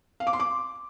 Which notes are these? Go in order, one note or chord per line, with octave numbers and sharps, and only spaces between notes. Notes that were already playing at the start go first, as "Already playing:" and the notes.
F5
D6
C6
D6